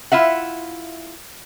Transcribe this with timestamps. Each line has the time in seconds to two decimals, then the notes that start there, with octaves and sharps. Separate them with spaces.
0.12 E4 F4 E5 F#5